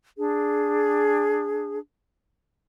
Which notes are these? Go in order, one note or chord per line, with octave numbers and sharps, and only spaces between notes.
D4 G#4